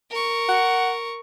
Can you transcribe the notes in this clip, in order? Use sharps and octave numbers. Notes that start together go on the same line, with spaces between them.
A#4 C#6
F#5